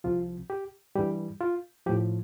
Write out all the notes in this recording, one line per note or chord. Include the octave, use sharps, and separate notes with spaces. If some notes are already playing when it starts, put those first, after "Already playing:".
C2 C3 F3 F4
G4
G2 E3 G3 G4
F4
A2 F3 G4